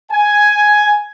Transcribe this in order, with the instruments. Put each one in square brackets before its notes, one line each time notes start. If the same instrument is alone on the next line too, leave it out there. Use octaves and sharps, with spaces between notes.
[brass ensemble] G#5